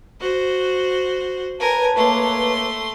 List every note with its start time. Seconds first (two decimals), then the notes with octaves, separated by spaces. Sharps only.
0.21 F#4 C5
1.59 A#4 B4 C#5 G#5 A5
1.97 A3 A#3 C6